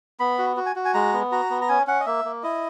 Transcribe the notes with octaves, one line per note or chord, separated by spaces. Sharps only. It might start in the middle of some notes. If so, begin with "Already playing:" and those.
B3 B5
F#4
F#4
G#5
F#4
G#5
G#3 A#5
B3
F#4 A#5
B3
A#5
C#4 G#5
C#4 F#5
D#5
A#3 E5
A#3
E4 D#5